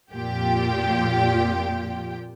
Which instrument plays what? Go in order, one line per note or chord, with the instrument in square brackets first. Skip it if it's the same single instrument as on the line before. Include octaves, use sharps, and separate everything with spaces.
[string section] F2 A#2 F4 G4 G5